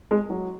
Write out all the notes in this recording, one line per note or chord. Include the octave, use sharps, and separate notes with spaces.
G#3
F#3